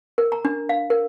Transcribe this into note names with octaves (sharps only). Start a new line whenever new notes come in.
A#4
A#5
D4
F5
A#4